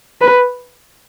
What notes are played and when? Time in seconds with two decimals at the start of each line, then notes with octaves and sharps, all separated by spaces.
0.21 B4